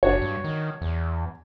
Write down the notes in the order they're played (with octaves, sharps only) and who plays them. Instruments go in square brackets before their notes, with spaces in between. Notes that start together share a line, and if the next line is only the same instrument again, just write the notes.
[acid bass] F#1 [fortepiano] D4 F#4 C#5
[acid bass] G2
D#3
E2